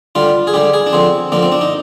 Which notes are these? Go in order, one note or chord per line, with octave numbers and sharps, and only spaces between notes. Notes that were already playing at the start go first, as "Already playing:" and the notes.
D3 G3 F4
G#4
D3 G3 G4
G#4
D4
D3 F3 C4
D3 F3 A#3
C4
D4
D#4